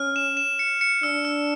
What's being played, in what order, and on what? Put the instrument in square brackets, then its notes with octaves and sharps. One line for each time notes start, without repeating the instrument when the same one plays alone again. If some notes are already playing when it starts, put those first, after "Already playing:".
Already playing: [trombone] C#4 [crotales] F6
[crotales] E7
E7
C#7
C#7
[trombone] D4 [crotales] E6
[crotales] E6